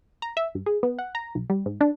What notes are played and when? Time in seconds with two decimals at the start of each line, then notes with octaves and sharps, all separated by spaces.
0.22 A#5
0.37 E5
0.55 G2
0.66 G#4
0.83 B3
0.99 F#5
1.15 A#5
1.35 B1
1.50 G3
1.66 G#2
1.81 D4